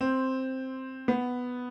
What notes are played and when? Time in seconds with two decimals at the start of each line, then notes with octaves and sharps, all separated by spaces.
0.01 C4
1.08 B3